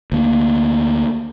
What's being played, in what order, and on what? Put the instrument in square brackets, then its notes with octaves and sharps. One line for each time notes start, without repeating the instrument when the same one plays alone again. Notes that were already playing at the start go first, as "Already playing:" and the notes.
[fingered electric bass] D2 A#3